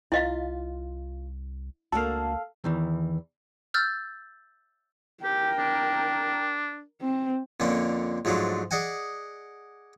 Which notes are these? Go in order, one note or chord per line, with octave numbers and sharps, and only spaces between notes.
C2 E4 F4 D#5 F5
C#2 A#3 D4 F#4 A4 F5
E2 D#3 E3
E6 F6 G6 A6
G4 A#4 G5
D4
C4
F2 A#2 D3 A#3 C#4
G#2 F3 F#3 A3 D4
G#4 D5 D#5 F#5 G#5